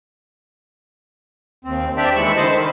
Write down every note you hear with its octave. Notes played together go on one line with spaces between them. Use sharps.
D#2 C4
C4 D4 G4 D5 E5 G5
D#2 E3 G#3 B5 C#6 E6
D3 G#3 C5 D#5 A5 B5
D#3